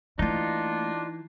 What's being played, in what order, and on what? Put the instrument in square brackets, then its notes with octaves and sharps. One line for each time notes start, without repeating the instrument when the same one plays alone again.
[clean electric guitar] E3 [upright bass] A3 A#3 [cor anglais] D4 [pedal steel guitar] D#4 F4